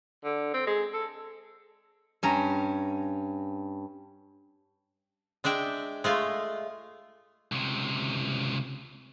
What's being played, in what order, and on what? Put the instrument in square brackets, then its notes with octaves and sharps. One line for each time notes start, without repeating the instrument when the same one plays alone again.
[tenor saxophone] D3
C4
G#3
A4
[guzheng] G2 C#4 A#5
[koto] G#3 D4 E5 G5
G#3 A3 F4
[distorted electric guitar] C#2 C3